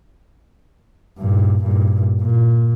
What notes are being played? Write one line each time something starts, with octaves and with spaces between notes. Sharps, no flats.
G2 A#2
G2 A#2
A#2